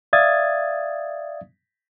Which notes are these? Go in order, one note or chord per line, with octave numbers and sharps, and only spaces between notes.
D5 E5 F5 D#6 G#6 A6